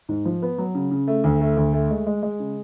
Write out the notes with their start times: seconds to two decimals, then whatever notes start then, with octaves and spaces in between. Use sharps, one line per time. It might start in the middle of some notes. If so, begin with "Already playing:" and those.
0.09 G#2
0.25 F3
0.42 B3
0.58 F#3
0.75 C#3
0.91 C#3
1.08 A3
1.24 D2
1.41 A3
1.57 D2
1.73 A3
1.91 G#3
2.07 G#3
2.23 G#3
2.40 C#3